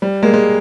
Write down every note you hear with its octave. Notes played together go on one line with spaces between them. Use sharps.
G3
G#3 A#3
G#3